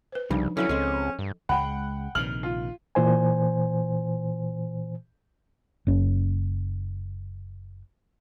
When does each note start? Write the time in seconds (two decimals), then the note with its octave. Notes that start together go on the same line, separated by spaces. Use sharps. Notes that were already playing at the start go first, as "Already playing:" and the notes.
0.12 B4 C5
0.30 C2 C#3 F3 G3 D4 D#4
0.57 D3 F#3 C#4 E4 B4
0.69 C#2 C4 G#4 A4 D#5
1.19 G2
1.49 C#2 G#3 F#5 G5 B5
2.15 A#1 C3 D#3 F6 F#7
2.43 F4
2.95 A#2 E3 C5 G#5
5.87 F#1 C#4